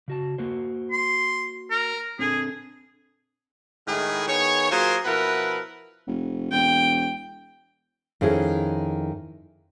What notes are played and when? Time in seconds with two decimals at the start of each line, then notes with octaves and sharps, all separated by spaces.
0.08 C#3 F#4 A5
0.38 A#3 F#4 C5
0.92 C6
1.70 A#4
2.19 C4 D4 G#4 A4
3.87 A2 D#3 G#3 A3 E4 G#4
4.27 D#3 B3 G#4 C#5
4.71 F#3 A#3 F4 G#4 A#4 C5
5.05 B2 F3 E4 A#4 B4 F#5
6.07 F1
6.51 E1 G5
8.21 F2 D#3 C#4 E4 G#4